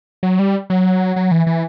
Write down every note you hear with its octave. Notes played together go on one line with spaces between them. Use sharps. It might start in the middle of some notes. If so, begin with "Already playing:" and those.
F#3
G3
F#3
F#3
E3
E3